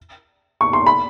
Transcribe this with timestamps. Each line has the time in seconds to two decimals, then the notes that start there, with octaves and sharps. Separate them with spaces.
0.61 C#6
0.73 C6
0.86 B5